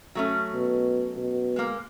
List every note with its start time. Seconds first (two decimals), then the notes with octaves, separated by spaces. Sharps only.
0.15 F#3 A3 C#4
0.54 B2
1.16 B2
1.56 G#3 A#3